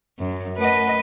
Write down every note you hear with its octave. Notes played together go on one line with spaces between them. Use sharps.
F#2
A3 A#4 B4 D#5 F#5